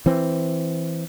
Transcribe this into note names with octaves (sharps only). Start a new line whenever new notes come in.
E3 C4